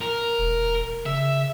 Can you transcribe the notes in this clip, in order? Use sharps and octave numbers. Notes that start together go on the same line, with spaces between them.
A#4
E1
C#3 E5